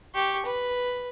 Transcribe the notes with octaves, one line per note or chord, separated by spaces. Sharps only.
G4 C#6
B4